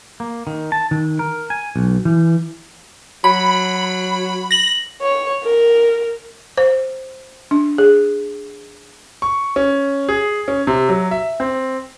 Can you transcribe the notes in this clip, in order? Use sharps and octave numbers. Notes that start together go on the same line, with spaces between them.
A#3
D#3
A5
D#3
A#4
G#5
B1
E3
F#3 B5
A#6 F#7
C#5
A#4
C5
D4
G#4
C#6
C#4
G#4
C#4
C3
F#3
E5
C4